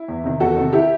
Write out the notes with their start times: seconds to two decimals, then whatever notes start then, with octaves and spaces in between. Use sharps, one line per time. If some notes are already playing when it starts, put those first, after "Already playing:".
Already playing: E4
0.08 E2
0.24 C3 D#3
0.40 E2 F#4 A4
0.56 C3 D#3
0.73 E4 G4